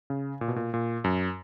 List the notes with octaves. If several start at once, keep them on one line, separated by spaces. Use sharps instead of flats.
C#3
A#2
B2
A#2
A#2
F#2